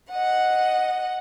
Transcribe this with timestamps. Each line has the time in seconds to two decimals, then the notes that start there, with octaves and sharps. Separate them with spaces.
0.11 D#5 F#5